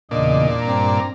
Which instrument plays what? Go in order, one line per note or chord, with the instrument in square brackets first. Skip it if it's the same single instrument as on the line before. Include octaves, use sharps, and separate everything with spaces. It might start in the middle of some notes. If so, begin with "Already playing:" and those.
[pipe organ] E2 C#3 D#5 [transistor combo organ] A#2 D4
[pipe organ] G2 A#5 [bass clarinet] C4